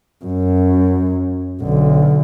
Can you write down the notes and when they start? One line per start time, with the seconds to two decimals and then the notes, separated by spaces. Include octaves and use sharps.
0.25 F#2
1.62 B1 D3